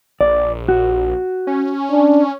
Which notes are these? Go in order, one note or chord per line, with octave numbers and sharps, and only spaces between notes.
A#1 D5
F#4
C#4
D4